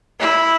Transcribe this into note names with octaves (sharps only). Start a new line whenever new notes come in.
E4